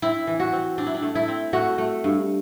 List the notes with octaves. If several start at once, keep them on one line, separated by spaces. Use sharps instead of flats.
C4 E4
E3
F#4
C4
C4 D4
E4
D4
A3
E4
C4
A3 F#4
A3
G2